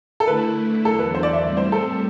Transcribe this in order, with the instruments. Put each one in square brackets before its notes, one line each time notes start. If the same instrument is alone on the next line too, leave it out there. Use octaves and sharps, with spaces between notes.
[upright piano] A4
[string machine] D3 A3 E4 [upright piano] B4
[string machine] E2 D3 F#3 [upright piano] A4
[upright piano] B4
C5
D5
E5
[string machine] A2 G3 C4 [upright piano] D5
[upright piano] C5
A4